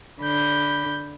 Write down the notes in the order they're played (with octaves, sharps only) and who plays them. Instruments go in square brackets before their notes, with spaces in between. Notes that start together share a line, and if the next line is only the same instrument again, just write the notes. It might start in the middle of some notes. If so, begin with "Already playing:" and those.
[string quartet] D3 B5 G6